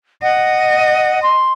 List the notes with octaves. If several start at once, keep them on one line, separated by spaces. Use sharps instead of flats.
D#5 F#5
C6